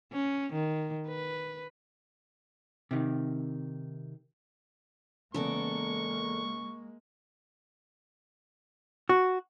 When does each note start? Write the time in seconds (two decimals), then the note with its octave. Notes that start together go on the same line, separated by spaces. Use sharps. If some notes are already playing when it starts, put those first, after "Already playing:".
0.13 C#4
0.53 D#3
1.07 B4
2.91 C3 D#3
5.34 E2 C#3 G#3 A#3 B3 A4 A#4 C#6
9.09 F#4